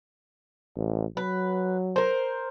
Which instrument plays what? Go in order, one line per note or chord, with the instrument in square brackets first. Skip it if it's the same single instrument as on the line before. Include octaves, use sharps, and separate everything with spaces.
[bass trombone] A1
[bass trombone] F#3 [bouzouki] B4
[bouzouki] A#4 C5